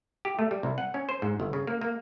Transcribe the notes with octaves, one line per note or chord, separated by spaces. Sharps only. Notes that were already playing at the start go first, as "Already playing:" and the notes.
G4
A3
G3
C2
F#5
C#4
C5
G#2
G1
C#3
A#3
A#3